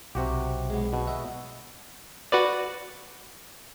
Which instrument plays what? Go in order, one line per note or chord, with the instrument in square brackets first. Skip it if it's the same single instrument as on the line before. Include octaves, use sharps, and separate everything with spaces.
[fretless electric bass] B1 [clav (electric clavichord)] C3 F#4 G4
[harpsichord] G#3 B3
[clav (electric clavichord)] B2 [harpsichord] F#4
[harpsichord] D#5 E5 F#5
[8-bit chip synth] F#4 B4 D5